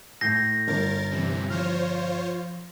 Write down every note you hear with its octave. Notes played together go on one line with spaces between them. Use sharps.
A2 G6 A#6 C7
G1 D4 A#4 A6
G2 C3 E3
F3 F4 C5 C#5 F6